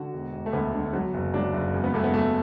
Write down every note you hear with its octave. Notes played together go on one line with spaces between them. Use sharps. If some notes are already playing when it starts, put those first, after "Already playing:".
Already playing: D3 F#4
E1
E1
A3
D2 B3
D3
F#3
F#1
F#3 D4
F#1
E2
B3
E2 A3
B3
E2 A3